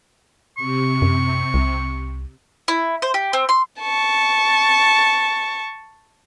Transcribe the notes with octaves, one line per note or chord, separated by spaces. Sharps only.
C3 C#6
F#2
C2
E4
C5
G4
C4
C6
A5 C#6